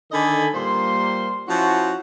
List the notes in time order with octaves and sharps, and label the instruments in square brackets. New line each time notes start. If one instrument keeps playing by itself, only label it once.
[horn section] D3 D#3 A4 D#5 G#5 B5
A#2 G3 A#3 C5 C6
F3 C#4 E4 F#4